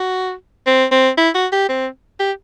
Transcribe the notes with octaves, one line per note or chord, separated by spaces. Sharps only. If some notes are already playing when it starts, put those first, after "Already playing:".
Already playing: F#4
C4
C4
E4
F#4
G4
C4
G4